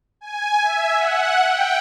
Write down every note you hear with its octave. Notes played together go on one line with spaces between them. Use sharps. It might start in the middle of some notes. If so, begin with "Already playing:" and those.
G#5
E5
F#5
G5